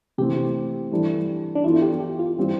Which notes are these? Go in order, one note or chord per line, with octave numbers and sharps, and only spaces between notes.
C3 E3 A3 C4 G4
E3 G3 D4 A4
D4
E3 B3 E4 F4 A4
G4
G4
F4
E3 G3 C4 G4